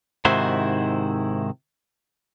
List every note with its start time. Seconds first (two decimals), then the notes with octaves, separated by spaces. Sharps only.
0.25 G#2 C3 D#3 E4 F#4 C5